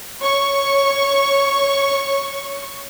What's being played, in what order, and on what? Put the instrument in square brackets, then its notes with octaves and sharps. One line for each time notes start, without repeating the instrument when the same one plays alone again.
[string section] C#5 C#6